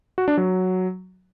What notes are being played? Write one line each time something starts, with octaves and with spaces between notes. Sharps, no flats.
F#4
D4
F#3